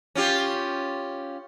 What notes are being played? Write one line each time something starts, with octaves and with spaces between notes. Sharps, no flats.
C#4 F4 G4